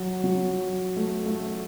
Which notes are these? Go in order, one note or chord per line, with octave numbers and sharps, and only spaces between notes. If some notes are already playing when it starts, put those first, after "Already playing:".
Already playing: F#3
F#3
A3
A3